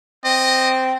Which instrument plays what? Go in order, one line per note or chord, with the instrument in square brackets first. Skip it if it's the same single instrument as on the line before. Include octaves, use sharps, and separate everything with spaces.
[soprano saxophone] C4 [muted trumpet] D#5